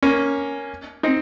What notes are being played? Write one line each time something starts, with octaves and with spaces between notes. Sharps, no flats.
A#3 C#4
C4 D#4